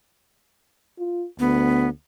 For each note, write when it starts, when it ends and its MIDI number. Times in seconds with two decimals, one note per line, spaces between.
0.99 1.25 65
1.39 1.88 38
1.39 1.89 59